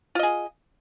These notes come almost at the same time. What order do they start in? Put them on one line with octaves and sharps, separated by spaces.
F4 D#5 G#4